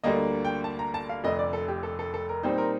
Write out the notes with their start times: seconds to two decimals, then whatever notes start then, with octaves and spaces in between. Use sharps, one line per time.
0.04 D2 D3 G3 A#3 D#5
0.45 G5
0.64 A5
0.79 A#5
0.94 A5
1.09 F5
1.24 F1 F2 D3 A3 D4 D#5
1.39 D5
1.53 A4
1.68 G4
1.83 A4
1.99 A4
2.14 A4
2.29 A#4
2.43 A#2 G3 C4 D#4 C5
2.58 A#4